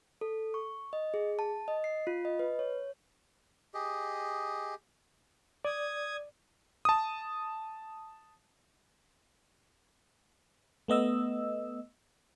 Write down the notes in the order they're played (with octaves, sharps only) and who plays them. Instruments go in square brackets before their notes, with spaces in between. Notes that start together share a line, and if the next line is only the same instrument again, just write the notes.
[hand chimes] A4
C#6
D#5
G#4
A5
D#5
C7
F4
D#5
B4
C#5
[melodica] G4 G#4 D#5
[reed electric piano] D5 [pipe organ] D#6 G#6
[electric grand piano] A5 D#6
[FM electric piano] A3 B3 D#5 E6